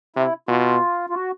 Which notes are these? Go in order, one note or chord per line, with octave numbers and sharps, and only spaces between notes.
C3 E4
B2 F4
F4
F#4